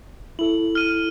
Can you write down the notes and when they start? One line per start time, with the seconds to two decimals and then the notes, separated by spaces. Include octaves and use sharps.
0.39 E4 A4 F#7
0.75 F6 D#7